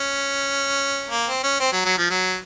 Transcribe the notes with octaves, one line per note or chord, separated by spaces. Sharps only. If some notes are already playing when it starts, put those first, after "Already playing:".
Already playing: C#4
A#3
C4
C#4
C4
F#3
F#3
F3
F#3